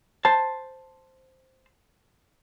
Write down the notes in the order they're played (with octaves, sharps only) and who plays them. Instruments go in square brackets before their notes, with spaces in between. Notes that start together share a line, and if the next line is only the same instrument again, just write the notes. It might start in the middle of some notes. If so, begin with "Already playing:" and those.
[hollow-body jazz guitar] C5 A5